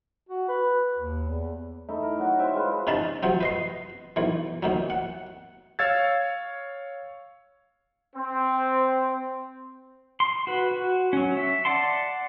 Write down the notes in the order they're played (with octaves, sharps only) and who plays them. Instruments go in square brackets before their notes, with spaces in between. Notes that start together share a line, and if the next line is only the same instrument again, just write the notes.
[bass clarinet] F#4
B4
D#2
E2
[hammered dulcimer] A3 D#4 E4
A#4
F#3 F#4
C5 E5 G5
G#3 F4 B4
[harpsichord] C3 C#4 D#4 A5 B5
C3 F3 F#3
B4 D#5 C6
B1 E3
D#2 C3 F#3
F#5
[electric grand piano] C#5 F5 E6 G#6 A6
[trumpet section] C4
[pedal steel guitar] C6
F#4 B4
F#4
F#3 C#4
E5
D5 F#5 A5 C6